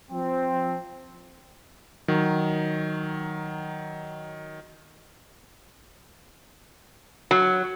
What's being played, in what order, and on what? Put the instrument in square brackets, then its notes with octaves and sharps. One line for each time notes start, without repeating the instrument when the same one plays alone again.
[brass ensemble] F3 C4
[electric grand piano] D#3 F#3
[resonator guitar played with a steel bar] F#3